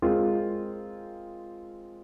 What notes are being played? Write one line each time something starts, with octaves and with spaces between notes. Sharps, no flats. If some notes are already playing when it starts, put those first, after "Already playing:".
G#3 C4 F4 A#4